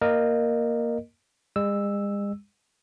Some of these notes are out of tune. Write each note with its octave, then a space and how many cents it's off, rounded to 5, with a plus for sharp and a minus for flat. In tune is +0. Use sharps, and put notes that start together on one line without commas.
A#3 +0 A#4 +0 D#5 -25
G#3 -40 E6 +0